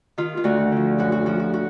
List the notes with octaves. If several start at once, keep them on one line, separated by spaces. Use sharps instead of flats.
D#3 F4
F4
D2 F#4
D3 F3
F#2 F#4
F#4
F3 F#4
F#4
F#4